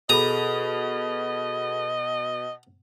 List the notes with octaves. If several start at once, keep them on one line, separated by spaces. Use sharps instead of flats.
B2 G#4 A4 D#5 A#5 B5 D#6